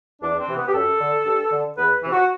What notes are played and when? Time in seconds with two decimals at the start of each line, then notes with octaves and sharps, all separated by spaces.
0.22 E2 D4
0.39 C4
0.48 C3 E3
0.56 B3
0.67 G4
0.74 F#2 A4
0.99 D3
1.25 G2
1.52 D3
1.77 E2 B4
2.03 C3 E3
2.11 F#4